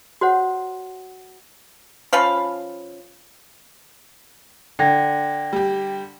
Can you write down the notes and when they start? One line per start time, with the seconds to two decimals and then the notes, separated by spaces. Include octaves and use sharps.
0.21 F#4 C5 C#5 F#5
2.13 F3 C#4 F5 B5
4.79 D3 G5 G#6 A#6
5.53 G3 G4